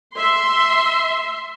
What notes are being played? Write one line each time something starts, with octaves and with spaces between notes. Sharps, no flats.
E5 C6